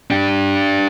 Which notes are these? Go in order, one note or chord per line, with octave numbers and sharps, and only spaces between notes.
D4 G4